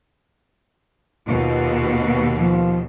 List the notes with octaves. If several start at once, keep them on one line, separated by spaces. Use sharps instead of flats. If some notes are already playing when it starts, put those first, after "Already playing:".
D#2 B2 F4
F3